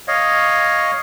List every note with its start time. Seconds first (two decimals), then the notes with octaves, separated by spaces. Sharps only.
0.08 C#5 D#5 F5